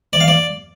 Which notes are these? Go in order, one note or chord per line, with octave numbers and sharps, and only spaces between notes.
D5
F5
D5